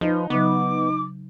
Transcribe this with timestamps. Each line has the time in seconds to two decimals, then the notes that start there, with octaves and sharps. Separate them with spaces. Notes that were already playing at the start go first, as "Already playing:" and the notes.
0.01 F3 D#4 B4
0.30 C#3 F#3 B3 D6